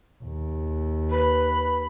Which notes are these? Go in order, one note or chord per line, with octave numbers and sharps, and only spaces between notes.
D#2
B4 B5